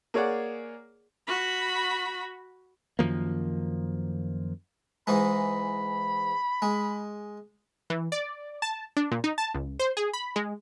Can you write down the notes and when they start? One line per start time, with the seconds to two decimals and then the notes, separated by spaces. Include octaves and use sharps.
0.14 A#3 G#4 C#5 D5 F#5
1.27 F#4 B5
2.99 F#2 D#3 F3 A#3
5.07 G#2 E3 G#3 B5
6.62 G#3
7.90 E3
8.12 D5
8.62 A5
8.97 D4
9.12 A#2
9.24 D#4
9.38 A5
9.54 C#2
9.79 C5
9.97 G#4
10.13 B5
10.36 G#3